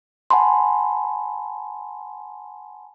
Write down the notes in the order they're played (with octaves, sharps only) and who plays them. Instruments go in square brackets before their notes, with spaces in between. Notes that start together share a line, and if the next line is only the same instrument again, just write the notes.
[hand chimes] F#5 G#5 A5 B5 C6